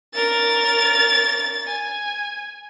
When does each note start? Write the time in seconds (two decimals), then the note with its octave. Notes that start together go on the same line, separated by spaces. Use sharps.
0.15 A#4 A6
1.67 G#5